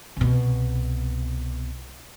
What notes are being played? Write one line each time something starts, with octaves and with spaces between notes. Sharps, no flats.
C2 B2